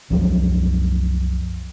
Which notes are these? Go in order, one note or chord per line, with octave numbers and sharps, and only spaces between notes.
C2 F#2 F3 F#3